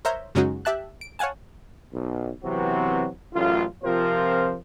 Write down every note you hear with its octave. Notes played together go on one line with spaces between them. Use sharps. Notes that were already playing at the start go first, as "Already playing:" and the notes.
A#4 C5 C#5 E5 A#5 G6
F#2 C#3 G#3 C#4 D#4 F#4
G4 E5 A5 F#6
D7
C#5 F5 F#5 G#5 A5
B1
C3 E3 F#3 B3 C4 F#4
A1 F#2 A2 F4
C3 F3 C4 F4 A#4 C5